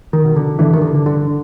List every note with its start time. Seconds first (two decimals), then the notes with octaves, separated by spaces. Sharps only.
0.13 D#3
0.25 B2
0.36 D3
0.59 G2 D3 E3
0.73 D#3
0.82 D3
0.94 D3
1.06 D3